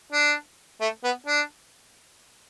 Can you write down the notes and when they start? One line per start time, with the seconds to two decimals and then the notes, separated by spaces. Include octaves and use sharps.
0.12 D4
0.81 A3
1.04 B3
1.26 D4